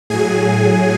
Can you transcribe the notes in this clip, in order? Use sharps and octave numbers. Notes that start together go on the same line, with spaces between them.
A2 F#3 G#4 G#5